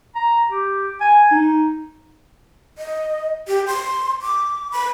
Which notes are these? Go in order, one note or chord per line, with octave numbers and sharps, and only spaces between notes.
A#5
G4
G#5
D#4
D#5
G4
C6
D6
B5